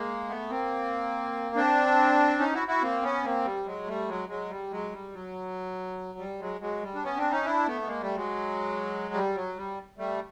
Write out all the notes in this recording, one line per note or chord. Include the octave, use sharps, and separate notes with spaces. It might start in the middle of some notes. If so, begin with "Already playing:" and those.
Already playing: G#3 A#3
A3 B3
A#3 C4
C4 D4
C#4 D#4
E4 F#4
E4 F#4
A#3 C4
B3 C#4
A#3 C4
G3
F#3 G#3
G3 A3
F#3 G#3
F#3 G#3
G3
F#3 G#3
G3
F#3
G3
F#3 G#3
F#3 G#3
G3
D4
B3 C#4
C4 D4
C#4 D#4
D4 E4
A3 B3
B3
G#3 A#3
G3 A3
F#3 G#3
G3
F#3
G3
G3 A3